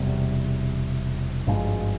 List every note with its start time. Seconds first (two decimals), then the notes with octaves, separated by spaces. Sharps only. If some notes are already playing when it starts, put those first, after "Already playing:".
Already playing: E1 E2 C3 G3
1.46 G#1 G2 F3 G#3